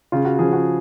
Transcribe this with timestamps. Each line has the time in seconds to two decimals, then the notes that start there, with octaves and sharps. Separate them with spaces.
0.12 C#3 F4
0.25 F#4
0.39 F3 G#4
0.53 F#4